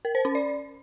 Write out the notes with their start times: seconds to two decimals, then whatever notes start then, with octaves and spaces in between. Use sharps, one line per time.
0.05 A#4
0.15 C5
0.25 C#4
0.35 D5